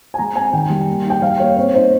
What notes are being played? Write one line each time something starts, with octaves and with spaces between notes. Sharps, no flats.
G#5
G#3 A#5
C4 G#5
D#3 G5
G3
A#3
D#4
G5
G3 F5
A#3 C#5
C4 C#5
D#4 C5